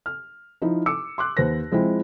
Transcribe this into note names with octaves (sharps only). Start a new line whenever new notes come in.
F6
F3 D#4 E4
D6 E6 C#7
C6 D6 F#6
D#2 B4 C5 A#6
F3 G#3 C4 E4